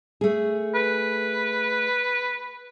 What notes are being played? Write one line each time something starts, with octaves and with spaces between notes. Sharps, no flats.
A3 G#4
B4